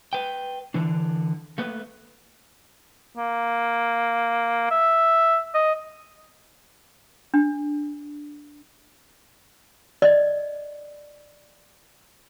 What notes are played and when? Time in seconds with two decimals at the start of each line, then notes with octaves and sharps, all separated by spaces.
0.13 B4 G5
0.74 D3 E3 D4
1.58 A3 A#3 B4
3.17 A#3
4.71 E5
5.55 D#5
7.34 D4
10.02 D5 D#5